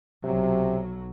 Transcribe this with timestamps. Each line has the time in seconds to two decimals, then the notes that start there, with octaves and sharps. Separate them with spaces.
0.24 B1 C3 F#3